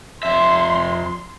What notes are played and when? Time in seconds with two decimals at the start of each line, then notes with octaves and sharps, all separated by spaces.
0.23 F2 E5 C6